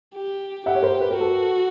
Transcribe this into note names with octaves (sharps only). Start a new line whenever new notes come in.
G4
G4 E5 F#5
C#5
A#4 C5
B4
A#4
F#4 A4 B4